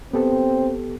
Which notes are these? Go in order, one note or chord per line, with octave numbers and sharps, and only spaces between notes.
B3 C4 G4 A4